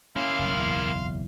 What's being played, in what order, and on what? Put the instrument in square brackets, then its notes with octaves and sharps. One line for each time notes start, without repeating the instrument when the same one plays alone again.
[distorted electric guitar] A#3 E4 [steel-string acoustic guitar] C#4 [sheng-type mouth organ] F5 C6 F6
[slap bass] F#1 B1
[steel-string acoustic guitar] E2